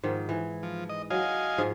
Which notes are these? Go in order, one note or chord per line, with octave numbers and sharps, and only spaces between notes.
G#2 D#3 F3
E3
F3
D#5
F#3 D#5 F5 G#5
G#2 F3 G#4